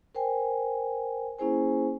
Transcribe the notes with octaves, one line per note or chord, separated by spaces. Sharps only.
A#4 C5 G5 G#5
A#3 C#4 E4 G#4 C5 G#5